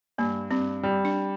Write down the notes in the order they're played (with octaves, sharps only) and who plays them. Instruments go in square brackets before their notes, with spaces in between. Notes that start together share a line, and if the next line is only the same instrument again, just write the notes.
[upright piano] G2 [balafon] A#3
[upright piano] G2 [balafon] C4
[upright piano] G3
[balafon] D4